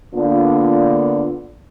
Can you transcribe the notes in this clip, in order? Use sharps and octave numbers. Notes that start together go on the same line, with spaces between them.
D3 A#3 B3 D4 F4